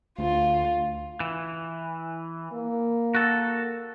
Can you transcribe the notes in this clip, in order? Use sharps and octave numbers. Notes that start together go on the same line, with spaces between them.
D2 F4
E3
A#3
F#4 A4